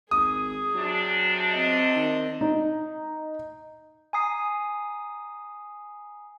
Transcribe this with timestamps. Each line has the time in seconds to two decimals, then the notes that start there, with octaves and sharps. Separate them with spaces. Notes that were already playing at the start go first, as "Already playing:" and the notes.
0.11 G#1 G#4 D#6
0.75 C3 F#3 D4
1.51 C4 D#5
1.95 D#3
2.41 D#4
4.13 G#5 A#5 D#6 C7